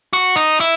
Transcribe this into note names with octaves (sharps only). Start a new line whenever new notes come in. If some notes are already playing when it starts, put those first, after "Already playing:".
F#4
D#4
E4